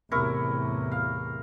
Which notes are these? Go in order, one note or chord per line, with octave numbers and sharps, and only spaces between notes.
E2 A2 C3 E4 A#4 C#6
F5